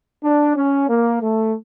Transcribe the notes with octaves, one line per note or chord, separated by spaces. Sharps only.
D4
C#4
A#3
A3